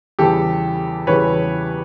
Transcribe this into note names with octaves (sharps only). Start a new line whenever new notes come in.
E2 C#3 E3 G3 G4 A4
E2 C#3 E3 G3 B4 C#5